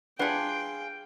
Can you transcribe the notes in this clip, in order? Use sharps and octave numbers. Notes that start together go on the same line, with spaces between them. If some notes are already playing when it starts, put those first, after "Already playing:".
D4 F4 G#4 B4 F#5 G5